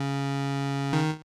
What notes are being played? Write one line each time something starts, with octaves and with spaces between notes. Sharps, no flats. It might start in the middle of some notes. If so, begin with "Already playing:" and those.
Already playing: C#3
D#3